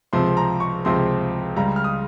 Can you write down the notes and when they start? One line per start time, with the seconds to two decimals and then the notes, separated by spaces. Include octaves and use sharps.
0.13 C#2 C3 F3 C4 C6
0.37 A#5
0.60 C#6
0.85 C#2 C3 F3 C4 C6
1.56 C#2 C#3 G3 A#5
1.76 F6
1.84 D#6